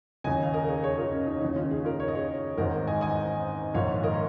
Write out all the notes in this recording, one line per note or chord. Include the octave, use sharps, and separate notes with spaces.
D#2 C#3 D#5 G#5
F5
A#4 D#5
A#4
G#4 C#5
G#4 C#5
F4 A#4
C#4
D#4
D#2 C#3 D#4
C#4 F4
D#4 G#4
F4 A#4
C#5
D#5
G#4 C#5
G#1 G#2 D#3 A#4 D#5
D#5 G#5
D#5 G#5
A#1 G#2 D#3 C#5 F5
A#4 D#5
C#5